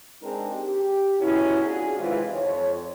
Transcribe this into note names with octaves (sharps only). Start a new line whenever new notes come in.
G#3 C4 D4 D#4 G#4 A#4
G4
B2 F#3 C#4 E4
D4 F4 F#4 G#4
C3 D#3 E3 G#3 F4
F2 C#5